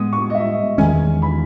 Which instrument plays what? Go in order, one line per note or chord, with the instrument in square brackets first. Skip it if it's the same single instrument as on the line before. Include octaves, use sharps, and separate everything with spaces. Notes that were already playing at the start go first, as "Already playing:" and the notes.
Already playing: [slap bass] A2 G#3 B3 [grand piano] D#6
[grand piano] C#6
D#5
E5
[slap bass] E2 D#3 G#3 C#4 [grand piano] G#5
[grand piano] B5